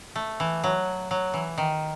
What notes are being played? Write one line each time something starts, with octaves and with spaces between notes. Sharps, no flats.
A3
E3
F#3
F#3
E3
D#3